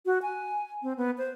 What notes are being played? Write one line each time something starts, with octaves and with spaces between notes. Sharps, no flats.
F#4
G#5
C4
B3
C5